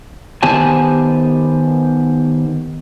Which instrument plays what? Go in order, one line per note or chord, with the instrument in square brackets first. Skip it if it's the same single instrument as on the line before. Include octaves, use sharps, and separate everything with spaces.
[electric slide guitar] D#3 B3 G4 C5 G#5 A5